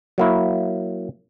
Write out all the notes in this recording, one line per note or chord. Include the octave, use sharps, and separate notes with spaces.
F#3 A#3 E4